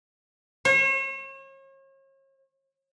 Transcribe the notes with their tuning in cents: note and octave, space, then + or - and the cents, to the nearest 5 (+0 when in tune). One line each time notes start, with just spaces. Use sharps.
C#5 -40